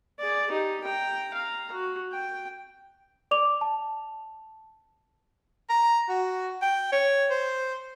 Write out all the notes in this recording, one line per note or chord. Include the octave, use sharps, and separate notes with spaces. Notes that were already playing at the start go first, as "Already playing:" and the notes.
G#4 D5
D#4 G4
G5 A#5
F5 A#5
F#4
G5
D5 D6 F7
A5
A#5
F#4
G5
C#5
C5